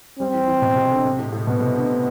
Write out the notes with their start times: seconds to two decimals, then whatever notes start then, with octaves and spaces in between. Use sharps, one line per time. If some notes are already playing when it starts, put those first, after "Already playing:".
0.19 G3 C4
0.34 E3
0.48 E3
0.62 B2
0.76 C3
0.91 D3
1.05 C3
1.19 A2
1.33 A2
1.47 B2 B3
1.61 C3
1.75 D3